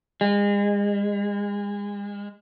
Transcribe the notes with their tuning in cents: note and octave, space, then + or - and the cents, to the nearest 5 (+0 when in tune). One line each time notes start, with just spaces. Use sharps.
G#3 -35